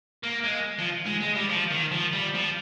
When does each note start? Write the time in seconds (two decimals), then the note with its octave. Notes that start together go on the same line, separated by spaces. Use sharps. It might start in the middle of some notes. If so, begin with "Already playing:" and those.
0.23 A#3
0.44 G#3
0.79 F3
1.07 G#3
1.21 G#3
1.36 G3
1.49 F3
1.71 D#3
1.91 F3
2.13 G3
2.34 F3